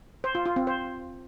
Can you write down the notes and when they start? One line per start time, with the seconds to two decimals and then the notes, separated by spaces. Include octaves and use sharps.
0.24 C5
0.35 F4
0.46 F4
0.56 C4
0.67 C5